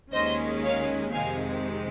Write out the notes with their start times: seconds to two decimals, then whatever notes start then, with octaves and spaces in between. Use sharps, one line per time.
0.12 D#2 D#3 G#3 C#4 C5 D#5
0.63 C#5 F5
1.12 F2 C3 D#3 G#3 C4 F5 G#5